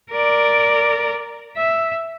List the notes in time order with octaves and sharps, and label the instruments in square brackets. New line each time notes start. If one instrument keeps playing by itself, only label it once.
[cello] A#4 D5
E5